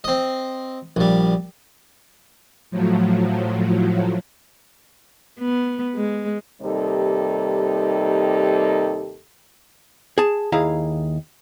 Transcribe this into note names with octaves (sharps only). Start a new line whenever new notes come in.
C4 D#5
A#1 G3
A2 F3 F#3
B3
G#3
D#2 C3 G3 D#4 G4 A4
G#4 A5
D#2 E4 G#4 F5 A#5